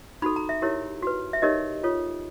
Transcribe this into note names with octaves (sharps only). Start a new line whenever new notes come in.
D#4 F#4 A4 B5
A#5
E5
E4 G4 A#4 C#5
F#4 B4
E5
D#4 G4 A#4 C#5 D#5
F4 A4 C#5